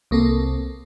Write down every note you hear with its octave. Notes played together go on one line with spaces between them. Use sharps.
C2 A#3 C4 A4